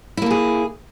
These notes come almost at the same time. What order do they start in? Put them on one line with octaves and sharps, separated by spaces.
E4 A#3 A4 G#4